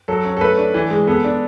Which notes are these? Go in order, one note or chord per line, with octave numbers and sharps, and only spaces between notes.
F#3 A4
C#4
A4
A3 B4
D4
E3
G#3
B3 A4
D4